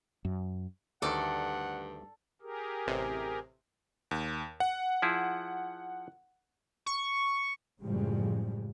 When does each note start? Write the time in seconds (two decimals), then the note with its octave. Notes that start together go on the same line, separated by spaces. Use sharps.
0.25 F#2
1.02 D2 G2 D#3 A4 D5 F#5
2.42 G4 G#4 A#4
2.87 A1 C3
4.11 D#2
4.60 F#5
5.02 F3 E4 G#4
6.86 C#6
7.81 F#2 A2 C#3 F3 G3 G#3